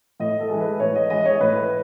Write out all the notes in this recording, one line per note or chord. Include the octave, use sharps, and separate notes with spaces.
A2 D#5
A4
E3 G#3
B4
A2 C#5
D#5
E3 G#3 D#5
C#5
A2 B4